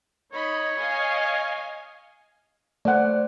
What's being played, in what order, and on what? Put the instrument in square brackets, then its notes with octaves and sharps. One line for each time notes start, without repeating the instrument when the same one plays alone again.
[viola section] D#4 D#5 B5 [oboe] C#5
[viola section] D#5 F5 G#5
[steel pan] A3 F#5 [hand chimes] C5 D5